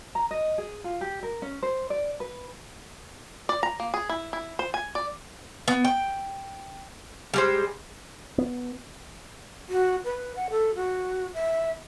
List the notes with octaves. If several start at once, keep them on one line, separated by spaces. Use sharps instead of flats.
A#5
D#5
G#4
F4
G4
A#4
C#4
C5
D5
B4
D5
A#5
A#3
G#4
E4
E4
C5
G#5
D5
B3
G5
G3 G#3 C5
B3
F#4
B4
F#5
A4
F#4
E5